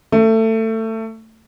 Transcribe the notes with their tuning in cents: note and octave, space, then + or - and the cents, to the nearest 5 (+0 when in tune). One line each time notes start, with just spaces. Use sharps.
A3 +20